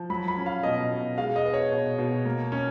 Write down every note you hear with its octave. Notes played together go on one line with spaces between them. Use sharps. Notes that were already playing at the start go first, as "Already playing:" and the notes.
Already playing: F3
F#3 B5
B5
C#4
F5
B2 D#5
B2
G#3 F5
D#5
B3
C#5
B2
B2
A#3
C#4